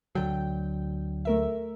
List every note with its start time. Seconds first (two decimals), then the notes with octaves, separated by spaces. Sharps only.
0.15 D2 D3 F#3 G5
1.25 A3 A#4 E5